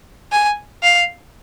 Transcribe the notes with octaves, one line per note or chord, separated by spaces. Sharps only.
G#5
F5